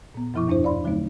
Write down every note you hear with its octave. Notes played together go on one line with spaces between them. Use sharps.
A#2 B3
F#2 B2 F3 E4 C#6 D6
E2 G2 D4 E4 C5
D5 F5 B5 C6
D3 F#3 A3 C4 D#4